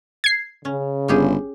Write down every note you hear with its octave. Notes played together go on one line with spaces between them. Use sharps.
G#6 C7
C#3 C#4
G1 C#4 G4 G#4